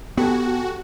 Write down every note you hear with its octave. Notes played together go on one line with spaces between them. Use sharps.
B3 F#4 G4 A4 G#5